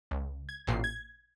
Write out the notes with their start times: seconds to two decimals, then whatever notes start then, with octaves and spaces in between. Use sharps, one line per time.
0.11 C#2
0.49 G#6
0.67 A1 A#2 C7
0.84 G#6